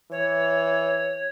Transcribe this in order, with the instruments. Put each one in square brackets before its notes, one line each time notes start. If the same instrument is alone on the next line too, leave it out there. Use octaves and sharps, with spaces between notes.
[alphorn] E3 [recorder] C#5